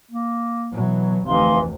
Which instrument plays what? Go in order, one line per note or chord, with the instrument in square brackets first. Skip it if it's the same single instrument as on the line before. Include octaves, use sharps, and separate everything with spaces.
[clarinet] A#3
[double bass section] B2 E3 F#3
[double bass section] F1 D2 C3 [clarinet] E3 [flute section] D#4 F5 C6